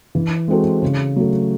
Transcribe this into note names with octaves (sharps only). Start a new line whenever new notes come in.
E3
G#3 C4 F#4 A4
C#3
F#3 A3